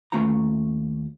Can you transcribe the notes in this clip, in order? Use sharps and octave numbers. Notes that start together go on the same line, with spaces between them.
D#2 A3 C#4 F4 A#5